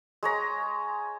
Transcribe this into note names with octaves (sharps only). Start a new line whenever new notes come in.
G#3 C#5 A#5